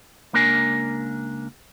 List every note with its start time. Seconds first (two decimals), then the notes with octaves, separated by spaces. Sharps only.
0.33 C#2 A#3 D4 A#4 G#5